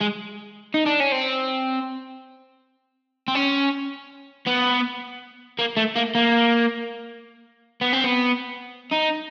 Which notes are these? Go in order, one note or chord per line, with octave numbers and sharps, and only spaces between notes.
G#3
D#4
D4
C#4
C4
C4
C#4
B3
A#3
A3
A#3
A#3
B3
C4
B3
D#4